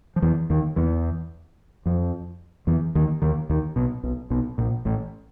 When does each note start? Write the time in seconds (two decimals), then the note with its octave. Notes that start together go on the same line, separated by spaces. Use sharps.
0.16 F3
0.22 E2 E3
0.50 D#2 D#3
0.76 E2 E3
1.86 F2 F3
2.67 E2 E3
2.95 D#2 D#3
3.22 D#2 D#3
3.49 D#2 D#3
3.76 B1 B2
4.03 B1 B2
4.30 B1 B2
4.58 A#1 A#2
4.85 A1 A2